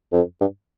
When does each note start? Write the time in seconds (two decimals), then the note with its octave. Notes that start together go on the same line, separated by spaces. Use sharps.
0.13 F2
0.41 G2